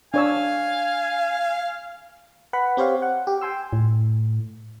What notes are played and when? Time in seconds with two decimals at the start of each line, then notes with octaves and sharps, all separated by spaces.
0.14 D4 C#5 F5 G#5 E6
2.53 B4 F#5 B5
2.77 C4 G4 C5 C#5 F5
3.02 F#5
3.27 G4
3.41 G5 G#5 C6 E6
3.73 A2